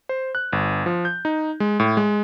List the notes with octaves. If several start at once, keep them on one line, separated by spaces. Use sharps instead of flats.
C5
F#6
G1
F3
G6
D#4
G#3
A2
G#3